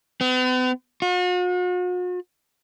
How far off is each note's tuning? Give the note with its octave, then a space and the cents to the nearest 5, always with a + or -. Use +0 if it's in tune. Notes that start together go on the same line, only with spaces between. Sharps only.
B3 +45
F#4 -45